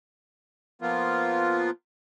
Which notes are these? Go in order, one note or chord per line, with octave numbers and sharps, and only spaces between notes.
F3 A#3 B3 F4